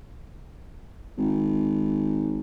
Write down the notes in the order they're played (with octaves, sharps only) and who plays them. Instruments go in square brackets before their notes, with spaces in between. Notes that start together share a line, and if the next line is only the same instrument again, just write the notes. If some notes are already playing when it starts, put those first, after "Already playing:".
[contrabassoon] G#1